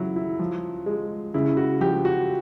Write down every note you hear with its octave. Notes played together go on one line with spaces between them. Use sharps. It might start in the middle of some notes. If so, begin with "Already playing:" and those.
Already playing: C#3 F#3 E4
E4
F3
G#3
C#3 E4
F#4
F3 G4
F#4